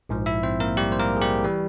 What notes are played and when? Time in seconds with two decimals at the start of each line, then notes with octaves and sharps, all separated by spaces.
0.09 A#1 G#2 F3
0.26 E4 E5
0.43 C4 C5
0.60 A#3 A#4
0.77 G3 G4
0.92 C5
0.99 A#3 A#4
1.16 G#4
1.22 G3 G4
1.44 E3 G3